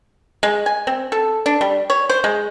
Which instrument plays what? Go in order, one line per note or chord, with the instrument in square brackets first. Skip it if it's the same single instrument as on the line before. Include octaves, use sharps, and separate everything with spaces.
[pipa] G#3
G#5
C4
A4
D4
G3
C#5
C5
G#3